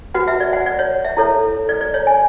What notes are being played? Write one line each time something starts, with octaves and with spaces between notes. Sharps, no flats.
F#4 B4 F#5
E5
D5
F#5
D5
C#5
E5
E4 A4 C#5
D5
D5
C#5
G#5